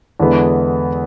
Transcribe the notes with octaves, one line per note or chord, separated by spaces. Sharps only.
E2 D3 G#3 B3 E4